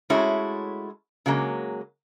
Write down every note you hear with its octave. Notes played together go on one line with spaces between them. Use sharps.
G#3 A3 C#4 E4 F#4 C#5
C#3 F#3 G#3 A#3